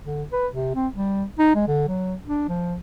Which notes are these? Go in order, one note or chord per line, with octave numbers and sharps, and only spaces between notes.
D3
B4
C3
C4
G3
D#4
G#3
D3
F#3
D4
F3